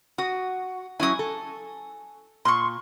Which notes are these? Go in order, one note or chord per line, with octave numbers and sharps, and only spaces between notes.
F#4 D#6
F#3 C#4 E4 G#5 D#6
A4
A#2 C6 C#6